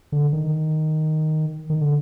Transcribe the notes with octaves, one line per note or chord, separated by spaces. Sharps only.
D3
D#3
D#3
D3